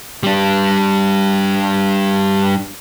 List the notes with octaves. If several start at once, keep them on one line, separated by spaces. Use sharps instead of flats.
G3 D4